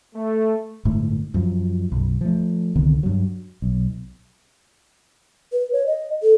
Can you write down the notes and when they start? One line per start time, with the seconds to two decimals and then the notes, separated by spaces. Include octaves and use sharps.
0.15 A3
0.85 G1 A2 G#3 A3
1.34 F#2 F3
1.92 B1 F#2
2.21 F3 A3
2.76 C2 D3 D#3 B3
3.03 G2 F#3
3.62 B1
5.53 B4
5.73 C#5
5.86 D#5
6.22 A4